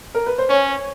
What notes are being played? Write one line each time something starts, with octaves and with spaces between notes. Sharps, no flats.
A#4
B4
C5
C#4 C#5